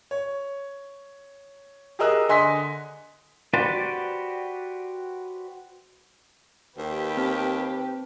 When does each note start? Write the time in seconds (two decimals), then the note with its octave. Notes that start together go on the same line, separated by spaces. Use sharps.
0.11 C#5
1.99 G4 G#4 A#4 D#5 E6 F#6
2.29 D3 D#5 G#5 C6 D#6 B6
3.54 F#4 G4 B4 C5 D5
6.78 D#2 G4 B4
7.17 C4 A5